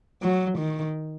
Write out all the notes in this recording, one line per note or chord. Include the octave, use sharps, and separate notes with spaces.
F#3
D#3